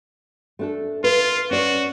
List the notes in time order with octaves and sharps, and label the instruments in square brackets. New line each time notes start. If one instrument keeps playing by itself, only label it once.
[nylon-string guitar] A3 D4 A4
[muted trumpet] F4 [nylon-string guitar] B4
[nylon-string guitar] C#4 D5 [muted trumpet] F#4